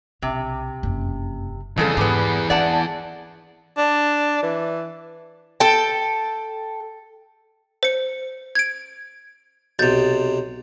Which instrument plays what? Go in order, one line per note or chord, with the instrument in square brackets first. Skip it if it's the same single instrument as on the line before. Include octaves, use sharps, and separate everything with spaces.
[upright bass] B1 [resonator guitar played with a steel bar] C3
[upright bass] F#1 F2
[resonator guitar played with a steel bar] F2 C#3 A4 [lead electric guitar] E3 G#4 [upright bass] G3
[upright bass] G#2 [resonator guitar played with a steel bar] G3 B3
[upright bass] C4 [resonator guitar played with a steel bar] D5 F#5 A5
[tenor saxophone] D4
E3
[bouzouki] A4 G5
[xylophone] C5 C#7
G#6 D7
[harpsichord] B1 C3 [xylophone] G6 A6